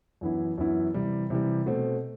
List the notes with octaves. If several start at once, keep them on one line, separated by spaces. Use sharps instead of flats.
F#2 E3 B3 E4
F#2 E3 B3 E4
C3 E3 G3
C3 E3 G3
B2 A3 C4